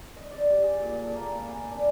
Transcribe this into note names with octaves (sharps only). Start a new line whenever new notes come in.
D#5
D5
G4
G#4
A#2
A4
A#3
B5
G#5
D4